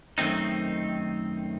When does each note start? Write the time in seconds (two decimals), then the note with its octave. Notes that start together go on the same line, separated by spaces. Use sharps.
0.18 F#2 D#3 A3 C4 D#4